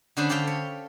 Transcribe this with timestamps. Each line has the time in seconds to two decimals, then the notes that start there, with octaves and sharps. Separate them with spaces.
0.17 D3 C#4 D4 G#4 C5 B5
0.29 G4 A4 D5 F5 G5
0.47 C#5